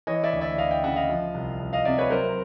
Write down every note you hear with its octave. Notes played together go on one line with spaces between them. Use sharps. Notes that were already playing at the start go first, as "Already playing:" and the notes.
E3 C#5 D#5
D5 E5
D2
D5 E5
D2 D#5 F5
F5 G5
C#3 E5 F#5
D#5 F5
F3
C2
C2
D#5 F5
C3 D5 E5
B4 C#5
F#3 A#4 C5